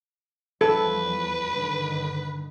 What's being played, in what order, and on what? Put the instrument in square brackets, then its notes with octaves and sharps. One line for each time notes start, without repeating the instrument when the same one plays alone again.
[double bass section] E2 F3 G3 [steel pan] A4 [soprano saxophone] B4
[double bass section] G2 D3 D#3